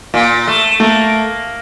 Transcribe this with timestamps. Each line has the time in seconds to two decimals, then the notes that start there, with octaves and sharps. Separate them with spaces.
0.14 A#2 A#3
0.47 A3
0.80 A3 A#3